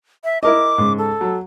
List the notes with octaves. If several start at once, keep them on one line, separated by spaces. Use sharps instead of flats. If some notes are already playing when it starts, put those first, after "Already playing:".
E5
E4 A#4 D#5 D6
G#2 C#3
A4
F#3